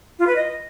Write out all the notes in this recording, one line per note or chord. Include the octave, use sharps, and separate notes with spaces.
F4
B4
D#5